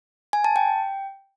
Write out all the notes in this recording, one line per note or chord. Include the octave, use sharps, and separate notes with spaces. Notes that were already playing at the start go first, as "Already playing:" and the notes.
G#5
A5
G5